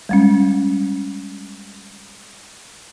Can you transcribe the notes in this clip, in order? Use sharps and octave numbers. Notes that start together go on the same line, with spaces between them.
G3 G#3 C#4